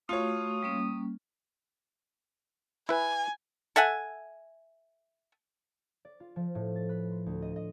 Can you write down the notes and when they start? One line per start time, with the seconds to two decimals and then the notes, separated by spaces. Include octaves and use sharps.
0.09 A3 F4 F#4 C#5 D#6
0.63 G3 A#3 C#4
2.89 E4 B4 G#5
3.76 A4 E5 F#5 G#5
6.05 D5
6.20 F4
6.36 F3
6.55 A2
6.76 A6
6.89 B4
7.11 C6
7.26 D2
7.42 D#5
7.56 D#5